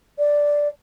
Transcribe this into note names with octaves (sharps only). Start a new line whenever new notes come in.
D5